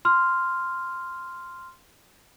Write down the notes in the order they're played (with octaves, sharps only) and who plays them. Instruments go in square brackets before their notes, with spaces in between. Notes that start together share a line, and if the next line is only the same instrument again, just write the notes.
[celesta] C6 F6